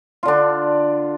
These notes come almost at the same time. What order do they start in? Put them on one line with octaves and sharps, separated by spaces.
F4 D3 D4